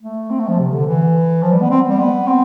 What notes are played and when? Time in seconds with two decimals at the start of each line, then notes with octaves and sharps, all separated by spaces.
0.02 A3
0.30 C4
0.40 A3
0.49 F3
0.59 C3
0.73 D3
0.86 E3
1.43 F3
1.52 G3
1.61 B3
1.71 C4
1.90 G3
1.99 B3
2.27 C4